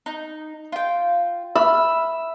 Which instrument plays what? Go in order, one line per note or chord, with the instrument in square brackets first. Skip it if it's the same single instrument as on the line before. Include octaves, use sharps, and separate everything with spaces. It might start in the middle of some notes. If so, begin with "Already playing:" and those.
[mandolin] D#4
F4 G5
[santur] E5 [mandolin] B5 F6